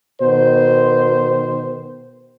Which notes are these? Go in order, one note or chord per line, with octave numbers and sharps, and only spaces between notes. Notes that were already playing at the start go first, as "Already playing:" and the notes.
B2 D#3 C5